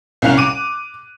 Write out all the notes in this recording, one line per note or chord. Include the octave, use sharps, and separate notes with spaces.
C2 C#4 F5 F#6 F7
D6 D#7